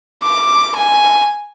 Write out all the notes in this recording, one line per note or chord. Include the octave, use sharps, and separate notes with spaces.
D6
G#5